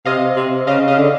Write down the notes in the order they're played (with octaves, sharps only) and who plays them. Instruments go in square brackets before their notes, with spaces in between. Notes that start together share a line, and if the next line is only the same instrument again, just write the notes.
[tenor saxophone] C3 [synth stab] D#5 F5
[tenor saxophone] C3
[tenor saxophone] C#3 [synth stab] D#5 F5
[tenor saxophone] C#3 [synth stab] D#5 F5
[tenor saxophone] D3